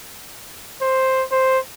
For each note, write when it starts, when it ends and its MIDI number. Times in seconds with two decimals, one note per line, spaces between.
0.82 1.23 72
1.32 1.58 72